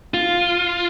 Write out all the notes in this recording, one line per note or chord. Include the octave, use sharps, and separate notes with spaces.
F4